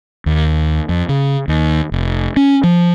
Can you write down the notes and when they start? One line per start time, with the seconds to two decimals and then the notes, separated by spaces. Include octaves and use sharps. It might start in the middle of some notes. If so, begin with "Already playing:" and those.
0.26 D#2
0.89 F2
1.09 C#3
1.48 D#2
1.92 F1
2.36 C#4
2.63 F3